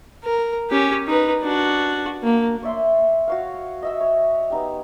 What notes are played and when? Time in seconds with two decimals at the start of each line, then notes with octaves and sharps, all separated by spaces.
0.24 A#4
0.70 C#4 G4
1.07 D#4 B4
1.43 D4 F#4
2.23 A#3
2.63 C#5 D5 E5 C6
3.28 F#4 C#5 F5
3.82 D#5 E5 E6
4.00 C#5
4.50 B3 D#4 G4